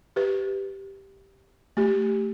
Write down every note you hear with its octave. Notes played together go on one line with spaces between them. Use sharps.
G4 B4
A3 G4